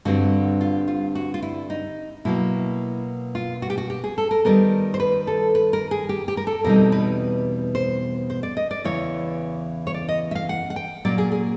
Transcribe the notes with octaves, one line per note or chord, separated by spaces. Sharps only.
G2 D3 G3 C4 F#4
F4
F4
F#4
F4
E4
D#4
B2 F#3 A#3 E4
F4
F#4
G4
F#4
G4
G#4
A4
A#4
D#3 G3 B3 A#4
C5
B4
A4
B4
A#4
G#4
G4
G4
A#4
A4
E2 B2 G3 C4 D#4 A#4
B4
C5
C5
D5
D#5
D5
E2 C#3 E3 C#5
C#5
D5
D#5
E5
F5
F#5
F#5
G5
A#2 F#3 A#3 C#4 D5
G#4
G#4